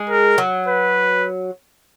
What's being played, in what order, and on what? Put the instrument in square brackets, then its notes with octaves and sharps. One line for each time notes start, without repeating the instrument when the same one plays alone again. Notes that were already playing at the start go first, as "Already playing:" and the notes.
Already playing: [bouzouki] G#3
[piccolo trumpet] A#4
[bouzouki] F#3
[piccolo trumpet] B4